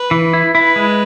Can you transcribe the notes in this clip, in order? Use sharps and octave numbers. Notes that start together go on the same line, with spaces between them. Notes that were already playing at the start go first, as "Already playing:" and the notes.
Already playing: B4
E3
E4
E4 B4
G#3